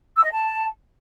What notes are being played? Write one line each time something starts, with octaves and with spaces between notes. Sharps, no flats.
E6
D#5
A5